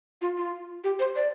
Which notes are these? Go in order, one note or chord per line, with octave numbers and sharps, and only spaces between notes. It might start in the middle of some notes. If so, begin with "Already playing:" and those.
F4
F4
G4
C5
D5